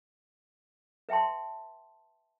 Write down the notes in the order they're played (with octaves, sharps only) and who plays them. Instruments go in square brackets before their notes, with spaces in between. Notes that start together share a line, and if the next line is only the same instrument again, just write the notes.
[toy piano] B4 E5 G5 A5 C6